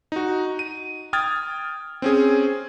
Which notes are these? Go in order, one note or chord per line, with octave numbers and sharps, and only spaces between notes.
D#4 F#4
D#7
G5 D#6 F6 G#6 A6
C4 C#4 G#4